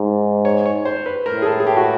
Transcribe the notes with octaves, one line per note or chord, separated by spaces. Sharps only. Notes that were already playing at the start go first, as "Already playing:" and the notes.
Already playing: G#2
C#5
C#5
C5
B4
A2 A#4
G#4
A4
G#4
G4
F#4